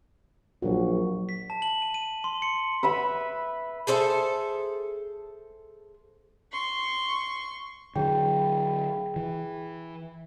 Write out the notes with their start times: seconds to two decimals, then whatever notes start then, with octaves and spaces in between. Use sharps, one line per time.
0.62 A#1 F#3 F#4
1.29 B6
1.50 A5
1.62 F#7
1.82 D#7
1.94 D#7
2.24 C6
2.42 C#7
2.83 B4 E5 B5
3.87 G#4 A4 C5 E5
6.52 C6 C#6
7.96 D3 F#3 G#4 G5
9.16 E3